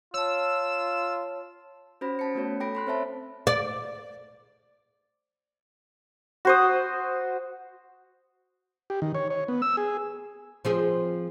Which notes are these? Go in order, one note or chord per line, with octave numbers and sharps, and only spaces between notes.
F4 C#5 A5 E6
C#4 F#4 C5 B5 A#6
C#4 A5 C#7
A3 B3 F#4 C#5
A4 G5 B5 A#6 D7
B5 C6 F#6
C4 C5 C#5 E5 A5 B5
D5
F#4 C5 D#6
G4
D#3
C#5
C#5
B3
E6
G#4
F3 C4 G#4